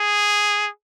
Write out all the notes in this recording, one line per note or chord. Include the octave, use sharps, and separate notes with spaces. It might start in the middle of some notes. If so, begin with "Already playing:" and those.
Already playing: G#4